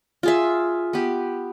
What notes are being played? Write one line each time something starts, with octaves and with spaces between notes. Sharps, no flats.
F4 G#4 E5
B3 G4